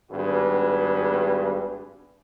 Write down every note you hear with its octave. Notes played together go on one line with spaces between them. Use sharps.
G#1 G2 B3 F#4 G#4 B4